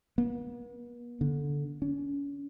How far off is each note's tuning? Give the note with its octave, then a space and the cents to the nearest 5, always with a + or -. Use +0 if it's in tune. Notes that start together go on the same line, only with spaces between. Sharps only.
B3 -45
D3 -15
C#4 +35